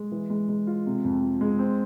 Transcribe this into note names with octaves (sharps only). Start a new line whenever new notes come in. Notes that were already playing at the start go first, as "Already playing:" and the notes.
Already playing: G#3
E3
G#3
G#3
F4
C3
F2
F3
G#3
C4